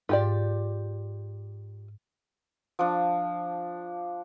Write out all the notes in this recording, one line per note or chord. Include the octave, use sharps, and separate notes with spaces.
G#2 F4 G4 D5
F3 D4